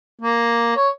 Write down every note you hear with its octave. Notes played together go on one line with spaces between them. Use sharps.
A#3
C#5